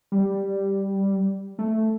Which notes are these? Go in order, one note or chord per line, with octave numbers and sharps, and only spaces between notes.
G3
A3